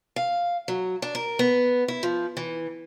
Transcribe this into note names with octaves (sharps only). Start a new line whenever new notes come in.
F5
F#3
D4
A#4
B3
E4
F3
E3